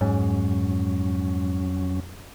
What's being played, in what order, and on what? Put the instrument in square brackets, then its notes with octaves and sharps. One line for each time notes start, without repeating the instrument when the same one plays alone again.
[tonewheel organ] F2 F#3 C#4 [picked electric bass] G#2